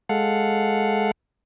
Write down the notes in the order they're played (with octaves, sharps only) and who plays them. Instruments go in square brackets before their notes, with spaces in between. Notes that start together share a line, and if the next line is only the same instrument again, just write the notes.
[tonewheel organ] G#3 A4 F5 F#5